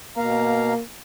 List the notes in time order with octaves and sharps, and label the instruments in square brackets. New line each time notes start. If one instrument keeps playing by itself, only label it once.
[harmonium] B2 F5 A#5 [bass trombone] A#3